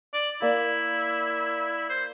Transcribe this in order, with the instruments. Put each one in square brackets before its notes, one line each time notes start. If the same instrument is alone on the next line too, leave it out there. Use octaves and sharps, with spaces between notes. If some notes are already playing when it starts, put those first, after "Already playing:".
[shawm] D5
[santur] A#3 D5 [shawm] E4
[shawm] C5